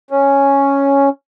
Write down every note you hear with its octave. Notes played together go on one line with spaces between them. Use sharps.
C#4